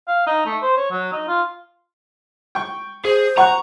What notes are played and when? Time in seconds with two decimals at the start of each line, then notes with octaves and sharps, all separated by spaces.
0.08 F5
0.26 D#4
0.46 A3
0.62 C5
0.77 C#5
0.91 F#3
1.12 D#4
1.28 F4
2.55 G5 C#6
3.05 G#4 C5
3.38 F#5 A#5 C#6 F#6